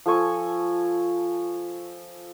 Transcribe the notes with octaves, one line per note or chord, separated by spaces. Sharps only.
F3 A4 G#5 C#6